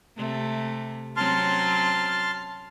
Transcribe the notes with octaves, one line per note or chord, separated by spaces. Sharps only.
C3 A3
F#3 C4 C#4 A5 C6 F6